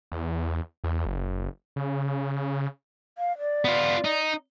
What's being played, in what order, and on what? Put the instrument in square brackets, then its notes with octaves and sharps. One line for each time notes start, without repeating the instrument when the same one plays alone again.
[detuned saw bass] E2
E2
F#1
C#3
[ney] F5
D5
[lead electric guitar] B3 F4
D#4